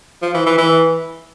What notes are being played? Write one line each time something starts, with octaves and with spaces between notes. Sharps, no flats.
F3
E3
E3
E3